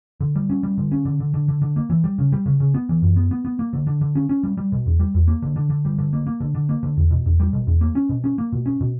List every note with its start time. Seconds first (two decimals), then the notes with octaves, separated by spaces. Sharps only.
0.20 D3
0.36 G3
0.50 C#4
0.63 G3
0.78 D3
0.91 C#4
1.05 D3
1.20 D3
1.34 D3
1.48 D3
1.62 D3
1.76 A#3
1.90 E3
2.04 G3
2.18 C#3
2.32 G3
2.46 C#3
2.60 C#3
2.74 B3
2.89 E3
3.02 F#2
3.16 B3
3.31 B3
3.45 B3
3.59 A#3
3.73 D3
3.87 D3
4.01 D3
4.15 C#4
4.29 C#4
4.43 G3
4.57 G3
4.72 B2
4.86 E2
4.99 G3
5.14 E2
5.28 A#3
5.42 D3
5.56 D3
5.70 D3
5.85 G3
5.98 D3
6.13 A#3
6.27 A#3
6.40 D3
6.55 D3
6.69 A#3
6.83 D3
6.97 E2
7.11 B2
7.26 E2
7.40 G3
7.53 B2
7.67 E2
7.81 A#3
7.95 C#4
8.09 B2
8.24 C#4
8.38 A#3
8.52 B2
8.66 C#4
8.81 B2